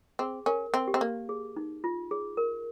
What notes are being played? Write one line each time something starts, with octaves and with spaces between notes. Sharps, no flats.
C4 G#4
C#4 A#4
C4
G4
C4
A#3
G#4
D#4
F4
G#4
A#4